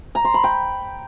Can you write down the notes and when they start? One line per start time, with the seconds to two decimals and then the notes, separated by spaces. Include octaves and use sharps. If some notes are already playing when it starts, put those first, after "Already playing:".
0.15 A#5
0.25 C6
0.34 B5
0.44 G5